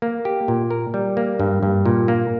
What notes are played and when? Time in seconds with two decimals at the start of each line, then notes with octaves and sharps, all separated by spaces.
0.02 A#3
0.25 G4
0.48 A#2
0.71 A#4
0.94 G3
1.17 A#3
1.40 G2
1.63 G2
1.85 A#2
2.08 A#3